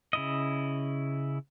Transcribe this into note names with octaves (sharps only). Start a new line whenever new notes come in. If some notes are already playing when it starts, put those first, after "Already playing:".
C#3 E4 D#5